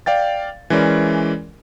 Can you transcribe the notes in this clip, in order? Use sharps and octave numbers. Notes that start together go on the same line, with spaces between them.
D5 F5 G5 A6
E3 G#3 C#4 A#4 D5